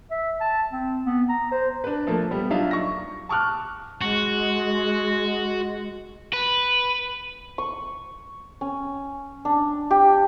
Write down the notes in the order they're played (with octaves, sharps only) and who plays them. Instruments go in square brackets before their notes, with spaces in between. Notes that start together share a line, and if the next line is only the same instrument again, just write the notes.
[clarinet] E5
A5
C4
B3
A#5
C5
[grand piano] D4 B4
F3 A3 A#3
G3 B3
F#3 D4 D#4 F4 E5 F5
C#6 A#6
A5 C#6 D6 F6 F#6
[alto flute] G#3 [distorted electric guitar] F#4
[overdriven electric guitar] B4
[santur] C#6
C#4
D4
G4